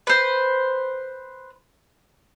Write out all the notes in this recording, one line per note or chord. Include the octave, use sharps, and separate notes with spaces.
B4 C5